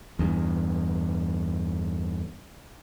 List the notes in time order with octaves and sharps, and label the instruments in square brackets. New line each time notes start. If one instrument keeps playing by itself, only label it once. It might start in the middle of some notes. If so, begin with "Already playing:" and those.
[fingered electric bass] E2 G2